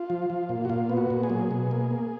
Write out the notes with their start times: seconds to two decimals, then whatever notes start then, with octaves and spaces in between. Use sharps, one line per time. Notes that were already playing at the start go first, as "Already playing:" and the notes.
Already playing: F4
0.10 F3
0.30 F3
0.49 A#2
0.65 F#4
0.69 A#2 F4
0.89 B3
0.97 F#4
1.10 A#2
1.23 G#4
1.30 F#3
1.51 B2
1.71 A#3
1.91 A#3